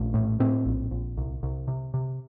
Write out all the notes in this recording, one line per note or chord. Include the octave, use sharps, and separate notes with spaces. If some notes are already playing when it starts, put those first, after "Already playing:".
Already playing: A#1 A3
A2
A2 C4
A#1
A#1
C2
C2
C3
C3